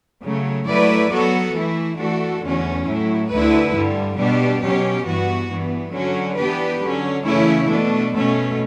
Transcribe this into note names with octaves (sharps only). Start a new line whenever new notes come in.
C#3 F#3 A3
F#3 A3 E4 B4 D5
F#3 B3 F#4 A4
E3 A3 E4
E3 A3 D4 F#4 A4
E2 D3 A3 C#4 F#4
A2 F#3 A3 E4
D2 D3 A3 E4 B4
G2 D3 G3
B2 G3 B3 D4 G4
B2 F#3 C#4 G4
G2 E3 B3 F#4
G2 E3 B3
D3 F#3 C#4 F#4
E3 B3 D4 G4 B4
D3 F#3 C#4
C#3 E3 A3 C#4 E4
B2 A3 D4
B2 A3 C#4